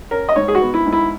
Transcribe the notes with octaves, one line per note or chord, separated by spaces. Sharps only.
C#4 A#4
D#5
G#2 C#5
G#4
F#4
B3
E4
G#2
E4